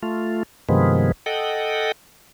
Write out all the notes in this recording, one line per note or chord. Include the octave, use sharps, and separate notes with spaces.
A3 F4
G2 C3 D#3 F3 G#3 B3
A4 D#5 F#5 G5